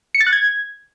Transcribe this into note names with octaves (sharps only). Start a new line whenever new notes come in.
C#7
A6
F#6
G#6